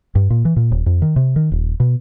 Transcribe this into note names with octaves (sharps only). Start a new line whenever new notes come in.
G2
A#2
E3
A#2
D#1
F2
D#3
C3
D#3
D#1
B2